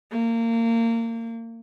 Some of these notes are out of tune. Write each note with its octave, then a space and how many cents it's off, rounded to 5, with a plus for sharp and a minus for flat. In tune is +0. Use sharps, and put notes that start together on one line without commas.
A#3 -25